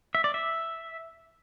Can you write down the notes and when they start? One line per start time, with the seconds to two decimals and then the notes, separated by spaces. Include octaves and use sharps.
0.15 E5
0.24 D5
0.34 E5